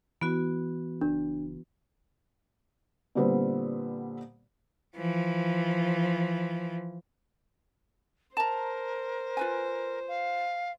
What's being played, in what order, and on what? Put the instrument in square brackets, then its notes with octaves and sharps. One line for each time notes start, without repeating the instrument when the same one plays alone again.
[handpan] E3 [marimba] B3 F#4
[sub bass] F#1 [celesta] D4
[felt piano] A#2 D3 G3 B3 C4
[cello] E3 F3
[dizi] A#4 [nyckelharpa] C5 [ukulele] A5 A#5
[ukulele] F4 B4 G#5
[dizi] F5